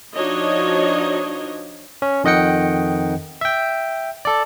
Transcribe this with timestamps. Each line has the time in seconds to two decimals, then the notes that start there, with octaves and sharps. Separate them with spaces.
0.13 F3 D4 D#4 F#4 C#5 D#5
2.02 C#4
2.24 F2 D#3 D#5 F#5 G5 C#7
3.41 E5 G5
4.25 A4 D5